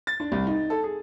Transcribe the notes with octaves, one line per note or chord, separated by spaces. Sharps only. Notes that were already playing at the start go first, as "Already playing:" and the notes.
A6
D4
C2
D#4
A4
G#4